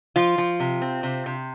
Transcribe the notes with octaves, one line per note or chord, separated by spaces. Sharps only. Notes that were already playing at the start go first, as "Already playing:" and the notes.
F3 F4
F3
C3
C4
C3
C3